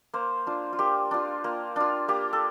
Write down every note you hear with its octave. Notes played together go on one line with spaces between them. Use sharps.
A#3 C5
D4 F4
F4
A#3 G4
D4 F4
A#3
D4 F4
A#3 G4
A4